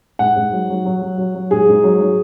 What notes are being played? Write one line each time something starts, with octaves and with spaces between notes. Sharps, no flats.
G#2 F#5
G#2
F#3
F#3
F#3
F#3
F#3
F#3
G#2 G#4
G#2
F#3
F#3